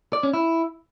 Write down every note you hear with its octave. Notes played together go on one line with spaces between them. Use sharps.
D5
C#4
E4